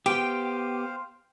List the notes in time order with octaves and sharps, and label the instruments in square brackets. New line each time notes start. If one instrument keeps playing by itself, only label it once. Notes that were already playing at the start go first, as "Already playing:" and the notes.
[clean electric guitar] B3 G4 [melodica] C5 F5 [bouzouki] G5